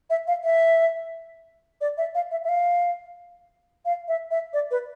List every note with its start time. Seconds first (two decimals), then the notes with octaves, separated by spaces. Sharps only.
0.10 E5
0.27 F5
0.44 E5
1.81 D5
1.98 E5
2.15 F5
2.31 E5
2.44 E5
2.49 F5
3.85 F5
4.08 E5
4.31 E5
4.53 D5
4.71 B4